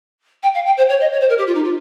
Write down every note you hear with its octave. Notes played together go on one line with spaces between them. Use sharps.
G5
F5
G5
C5
C#5
D#5
C#5
C5
A#4
G4
F4
D#4
F4